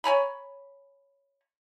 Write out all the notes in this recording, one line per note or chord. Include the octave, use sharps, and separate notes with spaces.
C#5 G#5 A#5 B5